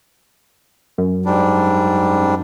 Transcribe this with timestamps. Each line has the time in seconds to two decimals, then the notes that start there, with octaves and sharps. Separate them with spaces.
0.98 F#2
1.25 G#2 G3 D4